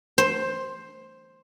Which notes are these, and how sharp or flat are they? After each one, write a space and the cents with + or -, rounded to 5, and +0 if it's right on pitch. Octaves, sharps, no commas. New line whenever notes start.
C5 +10